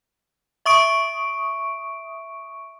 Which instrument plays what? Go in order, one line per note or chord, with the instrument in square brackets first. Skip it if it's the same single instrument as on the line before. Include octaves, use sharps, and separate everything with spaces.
[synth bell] E5 C#6 D#6 D7